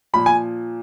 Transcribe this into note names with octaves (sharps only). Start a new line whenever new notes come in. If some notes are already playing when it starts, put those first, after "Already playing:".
A#2 F3 B5
G#5